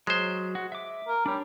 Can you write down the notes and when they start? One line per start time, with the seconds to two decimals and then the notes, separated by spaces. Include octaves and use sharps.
0.07 F#3 G#3 C5
0.55 F#4
0.72 E5 D6
1.08 A#4
1.26 G3 D4 C#5